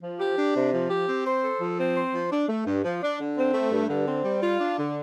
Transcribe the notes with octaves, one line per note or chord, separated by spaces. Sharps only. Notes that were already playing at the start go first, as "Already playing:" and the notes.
F3
G4
D4
C3
F3
G4
C4
C5
A4
F3
C4
C5
F3
D4
A3
G2
F3
D4
D3
C4
A3
G2
D3
C4
G3
F4
D4
D3